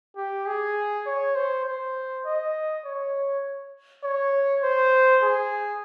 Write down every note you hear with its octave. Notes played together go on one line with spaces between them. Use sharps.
G4
G#4
C#5
C5
C5
D#5
C#5
C#5
C5
G#4